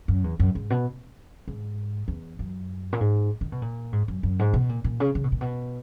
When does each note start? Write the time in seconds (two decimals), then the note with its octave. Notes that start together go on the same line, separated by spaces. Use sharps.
0.08 F#2
0.24 E2
0.40 F#2
0.55 G#2
0.70 B2
1.48 G#2
2.08 E2
2.39 F#2
2.93 A#2
3.00 G#2
3.41 D#3
3.52 B2
3.62 A#2
3.93 G#2
4.08 F#2
4.23 F#2
4.39 G#2
4.53 B2
4.69 A#2
4.84 A#2
5.00 C#3
5.15 C#3
5.24 B2
5.32 A#2
5.41 B2